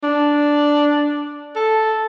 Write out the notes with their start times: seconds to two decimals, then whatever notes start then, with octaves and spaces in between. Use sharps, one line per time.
0.03 D4
1.55 A4